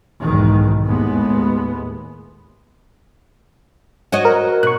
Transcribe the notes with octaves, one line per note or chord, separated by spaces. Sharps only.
B1 E2 G#2 B2 D#3
D#2 A2 G#3 B3
F#4 C#5 D#5
A#4
B2 C#6 F#6